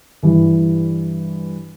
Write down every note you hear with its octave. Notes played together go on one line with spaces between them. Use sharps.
G2 E3 G3